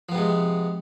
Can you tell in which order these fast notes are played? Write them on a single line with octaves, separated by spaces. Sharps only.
F3 B3 C3 G#3